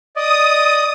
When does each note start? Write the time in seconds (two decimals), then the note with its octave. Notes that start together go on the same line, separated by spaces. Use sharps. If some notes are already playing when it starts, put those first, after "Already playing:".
0.16 D5 D#5 D#6